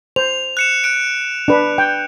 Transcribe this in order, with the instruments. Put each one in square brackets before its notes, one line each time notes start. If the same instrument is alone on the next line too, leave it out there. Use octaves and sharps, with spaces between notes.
[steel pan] C5 [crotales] F7
[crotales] F#6 C#7 E7
F#6 D7
[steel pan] D4 B4
G5